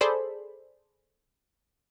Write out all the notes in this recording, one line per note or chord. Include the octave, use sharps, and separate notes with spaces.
G#4 A4 C5 D5 B5